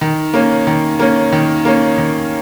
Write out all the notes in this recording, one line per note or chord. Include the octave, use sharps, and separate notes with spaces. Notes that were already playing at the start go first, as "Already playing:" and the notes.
D#3
A#3 C#4
D#3
A#3 C#4
D#3
A#3 C#4
D#3